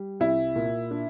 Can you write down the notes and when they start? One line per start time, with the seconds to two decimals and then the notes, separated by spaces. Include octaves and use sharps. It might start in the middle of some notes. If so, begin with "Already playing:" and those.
Already playing: G3
0.20 C2 E4
0.56 A#2
0.91 D4